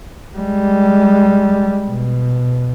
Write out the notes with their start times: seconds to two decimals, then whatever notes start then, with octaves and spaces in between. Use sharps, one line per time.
0.36 G3 G#3
1.87 B2